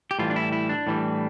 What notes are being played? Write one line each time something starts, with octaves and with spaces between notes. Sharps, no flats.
G4
A2 E3 G3 F4
D4
E4
E4
D4
A2 E3 G3